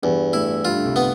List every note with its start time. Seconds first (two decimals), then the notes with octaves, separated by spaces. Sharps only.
0.02 E2 G2 G3
0.33 A2 A3 E4
0.65 G2 G3 F4
0.76 D3
0.85 C2 C3
0.96 B3